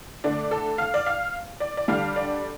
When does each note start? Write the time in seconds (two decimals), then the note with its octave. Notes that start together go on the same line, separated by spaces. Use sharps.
0.24 D3 A3 D4 D5
0.51 A4
0.78 F5
0.94 D5
1.06 F5
1.60 D5
1.77 D5
1.88 D3 G3 D4 F5
2.16 D5